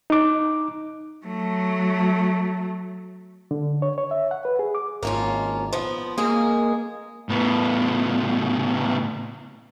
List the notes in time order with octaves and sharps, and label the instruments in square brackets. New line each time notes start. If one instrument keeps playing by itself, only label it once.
[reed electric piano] D#4 D6
[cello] F#3 A3
[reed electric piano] D3
C#5
C#5
E5
F#5
B4
G#4
D6
[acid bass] G#1 [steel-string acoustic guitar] A#3 C#4 F4
[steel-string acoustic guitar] F3 B3
[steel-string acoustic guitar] G#3 G#4 [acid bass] A#3
[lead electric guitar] A2 B3